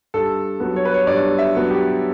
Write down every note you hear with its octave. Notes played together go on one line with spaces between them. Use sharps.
G2 A4
F#3 B3
C#5
B4
C#5
G2 D5
E5
F#3 B3
G4